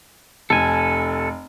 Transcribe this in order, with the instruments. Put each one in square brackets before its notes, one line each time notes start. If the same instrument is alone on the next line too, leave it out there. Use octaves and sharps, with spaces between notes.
[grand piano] F1 [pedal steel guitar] A4 G#5